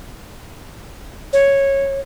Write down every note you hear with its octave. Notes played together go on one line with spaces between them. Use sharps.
C#5